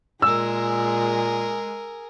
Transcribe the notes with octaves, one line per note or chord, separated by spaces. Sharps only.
A#2 G#3 G#4 A#4 E6